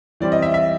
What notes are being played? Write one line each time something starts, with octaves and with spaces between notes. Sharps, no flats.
E3 G3 C4 D5
D#5
E5
E5